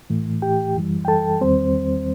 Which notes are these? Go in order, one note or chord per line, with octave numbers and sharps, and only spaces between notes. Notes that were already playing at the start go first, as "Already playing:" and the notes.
A2 E3 A3
G4 G5
F#2 E3 G3
G5
A4 A5
E2 D#3 G3 C4 C5